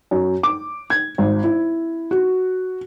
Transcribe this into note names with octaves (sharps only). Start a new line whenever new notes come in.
F#2
D6
G#6
G#1
E4
F#4